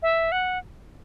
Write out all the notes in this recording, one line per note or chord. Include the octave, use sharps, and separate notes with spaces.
E5
F#5